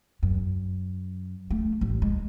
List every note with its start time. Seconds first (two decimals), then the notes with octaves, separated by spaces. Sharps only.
0.23 F#2
1.50 A3
1.81 A1
2.02 G#3